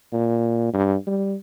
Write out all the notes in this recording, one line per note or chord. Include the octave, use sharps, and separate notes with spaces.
A#2
G2
G3